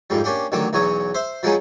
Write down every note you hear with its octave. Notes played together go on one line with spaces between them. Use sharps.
F2 G#2 G3
A#3 C#4 D4 G4
A1 D3 D#3 F#3 D6
B1 E2 F#3 C#5 D#6
C5 E5
F3 F#3 G#3 B3 C#4 D#4